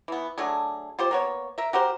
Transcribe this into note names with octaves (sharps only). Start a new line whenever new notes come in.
E3 B3
F#3 A3 D4 G#4
F4 G4 C5
A#3 B3 C#5
A#4 E5
F#4 G4 A#4 C5